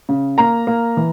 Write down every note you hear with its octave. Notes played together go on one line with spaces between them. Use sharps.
C#3
A#3 A#5
A#3
E3